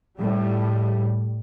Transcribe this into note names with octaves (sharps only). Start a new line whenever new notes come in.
A2 G3